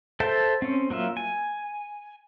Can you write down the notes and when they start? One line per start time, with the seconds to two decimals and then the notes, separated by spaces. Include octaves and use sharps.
0.20 A4 C5 E5 G5 A5
0.62 C4 C#4
0.90 F#3 A#3 F4 E5
1.17 G#5